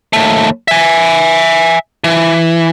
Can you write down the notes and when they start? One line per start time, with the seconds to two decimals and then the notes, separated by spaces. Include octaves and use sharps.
0.13 D#2 A3
0.68 E5 G#5
2.04 E3